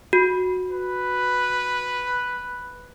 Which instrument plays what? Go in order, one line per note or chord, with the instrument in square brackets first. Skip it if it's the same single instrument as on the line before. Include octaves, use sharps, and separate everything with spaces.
[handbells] F#4
[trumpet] B4